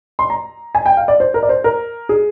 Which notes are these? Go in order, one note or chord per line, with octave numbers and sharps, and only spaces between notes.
C6
A#5
G#5
G5
F5
D5
C5
A#4
D5
C5
A#4
G#4